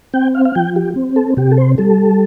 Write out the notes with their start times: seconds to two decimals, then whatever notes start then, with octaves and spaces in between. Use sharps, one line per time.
0.13 C4 G5
0.35 F5
0.45 F5
0.55 F3 G5
0.76 G4
0.96 C4
1.16 A4
1.37 C3 G4
1.51 A4
1.57 C5
1.78 G3 A4